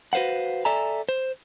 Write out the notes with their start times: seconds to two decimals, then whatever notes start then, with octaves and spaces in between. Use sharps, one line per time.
0.13 F#4 B4 C5 F5 F#5
0.65 A4 D5 E5 G#5 A#5
1.09 C5